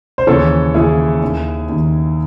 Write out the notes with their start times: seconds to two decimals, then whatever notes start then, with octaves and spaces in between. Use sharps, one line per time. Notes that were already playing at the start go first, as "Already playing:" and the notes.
0.18 C5
0.27 D#2 C#3 E3 A4 C#5
0.74 D#2 C#3 E3 E4 G#4
1.22 D#2 D#3
1.69 D#2 D#3